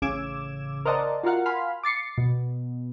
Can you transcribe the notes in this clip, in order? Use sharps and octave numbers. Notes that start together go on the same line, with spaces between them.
A1 C#3 D6 E6 G#6 E7
A#4 C5 D5 D#5 F#5 A5
F4 F#4 A#4 F5 F#5
F5 G#5 B5 C6 F6
D6 A6 C7 C#7
B2